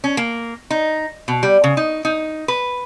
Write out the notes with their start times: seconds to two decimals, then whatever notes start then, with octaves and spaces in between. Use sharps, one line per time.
0.04 C#4
0.17 A#3
0.70 D#4
1.28 B2
1.43 G3
1.64 C#3
1.77 D#4
2.05 D#4
2.48 B4